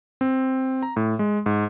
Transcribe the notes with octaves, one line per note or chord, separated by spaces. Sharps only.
C4
A#5
A2
G#3
G#2